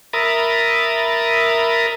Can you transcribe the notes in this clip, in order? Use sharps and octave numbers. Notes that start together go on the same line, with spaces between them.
A#4 E5 A#5 B5 D#6 A6